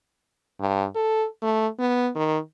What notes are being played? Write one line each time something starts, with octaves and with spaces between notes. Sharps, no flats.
G2
A4
A3
B3
D#3